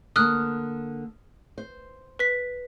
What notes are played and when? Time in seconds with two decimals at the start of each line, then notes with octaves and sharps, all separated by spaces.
0.16 D3 A#3 D#6 F6 F#6
1.58 C5
2.19 B4 B6